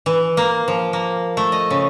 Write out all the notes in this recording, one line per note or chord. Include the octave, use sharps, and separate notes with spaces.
E3
A#3
F3
A#3
A3
D#5
C#3